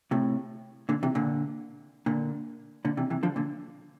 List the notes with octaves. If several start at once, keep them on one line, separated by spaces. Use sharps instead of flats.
A2 C3
A#2 D3
C3 E3
A#2 D3
A#2 D3
A#2 D3
C3 E3
C3 E3
D3 F3
A#2 D3